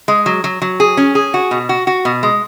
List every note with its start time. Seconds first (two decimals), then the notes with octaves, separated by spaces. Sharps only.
0.08 G#3
0.26 F#3
0.44 F#3
0.62 F#3
0.80 G#4
0.97 C#4
1.15 G#4
1.34 F#4
1.51 B2
1.69 F#4
1.87 F#4
2.05 B2
2.23 G#3